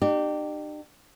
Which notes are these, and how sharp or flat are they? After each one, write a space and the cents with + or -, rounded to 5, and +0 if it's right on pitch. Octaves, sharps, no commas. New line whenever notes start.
D4 +45 G4 -10